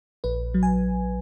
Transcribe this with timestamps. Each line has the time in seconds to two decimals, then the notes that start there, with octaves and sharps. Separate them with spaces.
0.24 A#1 B4
0.54 F#3
0.63 G#5